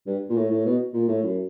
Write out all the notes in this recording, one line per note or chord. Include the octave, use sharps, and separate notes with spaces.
G2
A#2
A2
A2
B2
A#2
A2
F#2